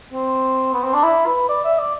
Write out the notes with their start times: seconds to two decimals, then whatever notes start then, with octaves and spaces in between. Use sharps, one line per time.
0.13 C4
0.73 B3
0.84 C4
0.94 D4
1.04 E4
1.26 B4
1.49 D5
1.64 E5
1.79 D5